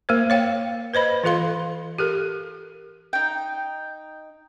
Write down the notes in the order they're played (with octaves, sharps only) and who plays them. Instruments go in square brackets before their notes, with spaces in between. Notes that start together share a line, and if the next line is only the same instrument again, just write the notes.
[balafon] A#3 A#4 C5
C#5 F5 G5
B4 C5 D#5 B5
E3 F4 A4 F5 C6
G4 A4 A#4
[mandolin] D#4 G5